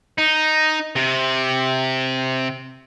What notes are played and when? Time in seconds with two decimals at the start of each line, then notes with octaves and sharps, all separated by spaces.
0.18 D#4
0.96 C3